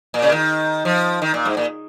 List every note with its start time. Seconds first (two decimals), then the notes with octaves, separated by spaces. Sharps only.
0.14 A#2
0.22 C#3
0.32 D#3
0.85 F3
1.22 D#3
1.34 A#2
1.45 G#2
1.57 A#2